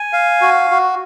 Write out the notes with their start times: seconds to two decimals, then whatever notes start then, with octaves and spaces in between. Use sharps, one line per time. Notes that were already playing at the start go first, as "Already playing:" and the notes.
Already playing: G#5
0.13 F5
0.42 F#4
0.71 F#4